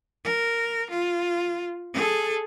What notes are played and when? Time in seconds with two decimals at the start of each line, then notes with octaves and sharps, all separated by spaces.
0.25 A#4
0.90 F4
1.94 G#4 A4